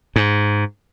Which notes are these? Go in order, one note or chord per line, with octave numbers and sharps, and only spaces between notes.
G#2